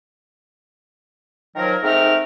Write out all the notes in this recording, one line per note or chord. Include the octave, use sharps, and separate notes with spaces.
D#3 F3 F#3 A#4
G#2 A3 C4 D#4 A#4 F6